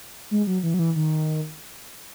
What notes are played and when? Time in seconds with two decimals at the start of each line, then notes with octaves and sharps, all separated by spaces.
0.31 G#3
0.47 F#3
0.63 E3
0.74 F#3
0.79 E3
0.96 D#3